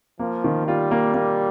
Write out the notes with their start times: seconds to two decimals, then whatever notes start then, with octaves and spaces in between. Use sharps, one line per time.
0.19 F3 A#3
0.44 D#3
0.67 G3 F4
0.91 A#3
1.14 A#3